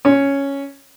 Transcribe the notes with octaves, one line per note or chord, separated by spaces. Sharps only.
C#4